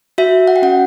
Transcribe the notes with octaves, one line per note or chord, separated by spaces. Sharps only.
F#4 E5
F#5
G5
C#4 F#5